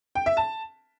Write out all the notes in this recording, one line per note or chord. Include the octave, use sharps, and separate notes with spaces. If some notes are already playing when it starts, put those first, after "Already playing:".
G5
E5
A5